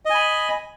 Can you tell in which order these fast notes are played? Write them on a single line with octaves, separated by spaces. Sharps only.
D#5 G#5 B5